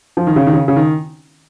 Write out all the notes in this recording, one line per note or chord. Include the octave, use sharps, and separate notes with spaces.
F3
D#3
C#3
D#3
C#3
C#3
D#3